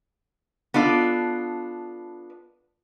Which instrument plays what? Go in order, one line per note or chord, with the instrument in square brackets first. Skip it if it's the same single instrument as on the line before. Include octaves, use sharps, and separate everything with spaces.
[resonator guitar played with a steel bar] B3 D4 F4 A4